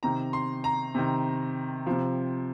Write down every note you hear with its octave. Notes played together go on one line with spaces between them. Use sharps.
C3 D#3 A#5
C6
A#5
C3 D#3
C3 F3